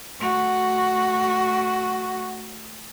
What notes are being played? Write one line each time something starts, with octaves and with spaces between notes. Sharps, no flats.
A3 F#4